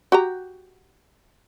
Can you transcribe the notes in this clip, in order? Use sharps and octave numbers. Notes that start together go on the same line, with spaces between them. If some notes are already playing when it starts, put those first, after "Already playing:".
F#4 G4 A#5